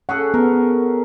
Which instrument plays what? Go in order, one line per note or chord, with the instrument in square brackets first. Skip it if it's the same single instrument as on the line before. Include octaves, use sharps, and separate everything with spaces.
[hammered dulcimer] C#4 G#4 A4 [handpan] F#5
[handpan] B3 [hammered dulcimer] A#4